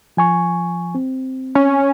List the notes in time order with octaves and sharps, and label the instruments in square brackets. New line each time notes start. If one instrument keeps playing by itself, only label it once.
[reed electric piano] F3 G#5 C#6
C4
[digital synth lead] C#4